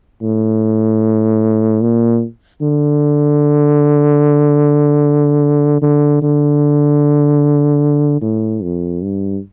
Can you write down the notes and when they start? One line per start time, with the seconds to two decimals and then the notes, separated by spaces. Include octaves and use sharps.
0.22 A2
1.81 A#2
2.61 D3
5.82 D3
6.22 D3
8.22 A2
8.62 F2
9.02 G2